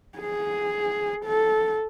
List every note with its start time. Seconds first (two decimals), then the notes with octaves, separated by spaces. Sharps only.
0.19 G#4
1.25 A4